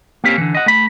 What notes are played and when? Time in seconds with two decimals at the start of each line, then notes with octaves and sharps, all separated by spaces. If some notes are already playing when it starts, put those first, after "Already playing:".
0.24 A#3 C4 C#4 G4 A#4
0.38 D3 E3
0.55 D#5 F#5
0.66 A3 B5